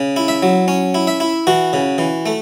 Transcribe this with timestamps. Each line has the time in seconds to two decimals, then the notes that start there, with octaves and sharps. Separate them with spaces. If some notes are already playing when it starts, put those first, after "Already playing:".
Already playing: C#3
0.16 E4
0.28 E5
0.43 F#3
0.68 C#4
0.94 E4
1.07 E5
1.20 E4
1.47 E3 F#4
1.73 C#3
1.98 E3
2.26 A3